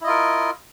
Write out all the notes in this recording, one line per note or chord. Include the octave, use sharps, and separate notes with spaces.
E4 F4 A#4 D#5